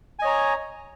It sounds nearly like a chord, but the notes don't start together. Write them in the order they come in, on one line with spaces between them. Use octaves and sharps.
G#5 D#5 C#5 A#5